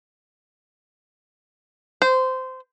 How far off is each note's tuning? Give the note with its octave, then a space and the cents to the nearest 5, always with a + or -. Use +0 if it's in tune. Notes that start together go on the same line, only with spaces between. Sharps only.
C5 -20